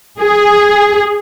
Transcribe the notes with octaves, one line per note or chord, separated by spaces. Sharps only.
G#4